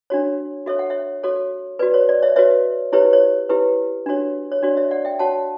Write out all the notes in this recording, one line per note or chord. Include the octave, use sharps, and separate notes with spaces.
D4 F#4 C#5
F#4 A4 C#5 E5
F#5
C#5 E5
F#4 A4 C#5
F#4 B4 D5
C#5
D5
C#5 E5
F#4 B4 C#5 E5
E4 G4 B4 C#5
C#5
E4 G4 B4
D4 F#4 C#5
C#5
D4 F#4 C#5 D5
C#5 E5
D5 F#5
E5 G5
F#4 C#5 F#5 A5